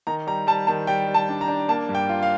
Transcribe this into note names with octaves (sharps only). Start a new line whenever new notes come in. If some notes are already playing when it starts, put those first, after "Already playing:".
D#3 A#5
G3 A#5
G3 A5
D#3 A5
G3 G5
G3
A5
D4
A#5
D4
A#3 A5
G2
G5
F4
F5